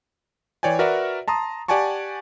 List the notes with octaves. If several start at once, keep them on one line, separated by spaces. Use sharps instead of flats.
E3 C#5 D5 G5 G#5
F#4 A#4 B4 D5 E5 F#5
A5 A#5 C6 D#6
G4 D5 F#5 G#5 A5 C#6